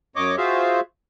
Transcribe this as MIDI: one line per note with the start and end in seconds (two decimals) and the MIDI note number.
0.16 0.36 42
0.16 0.36 73
0.16 0.36 75
0.16 0.36 86
0.37 0.80 65
0.37 0.80 66
0.37 0.80 68
0.37 0.80 72
0.37 0.80 76
0.37 0.80 77